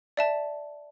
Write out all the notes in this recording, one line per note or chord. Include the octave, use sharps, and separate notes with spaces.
D5 E5 A5